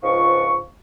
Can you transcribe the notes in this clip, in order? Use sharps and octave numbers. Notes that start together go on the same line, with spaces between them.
C#2 G#2 F3 D4 C#6